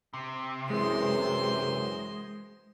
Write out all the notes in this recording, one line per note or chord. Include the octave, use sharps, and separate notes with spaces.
C3
F#2 E3 G#3 C5 C6